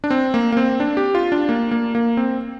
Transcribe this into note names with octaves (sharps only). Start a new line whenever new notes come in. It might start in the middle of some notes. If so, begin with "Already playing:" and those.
D4
C4
A#3
A#3
C4
D4
G4
F4
D4
A#3
A#3
A#3
C4